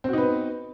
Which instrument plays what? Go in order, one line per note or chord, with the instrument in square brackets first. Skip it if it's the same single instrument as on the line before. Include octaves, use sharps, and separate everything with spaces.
[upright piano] C4
F#4
D#4
B4
B3